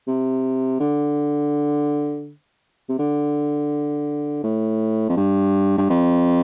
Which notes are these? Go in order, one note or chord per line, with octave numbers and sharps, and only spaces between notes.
C3
D3
C3
D3
A2
F2
G2
G2
F2